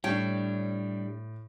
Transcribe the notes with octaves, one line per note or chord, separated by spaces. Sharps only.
A2 G3 D4 C#5 G5